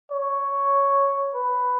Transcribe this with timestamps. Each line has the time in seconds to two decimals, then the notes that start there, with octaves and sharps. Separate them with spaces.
0.12 C#5
1.35 B4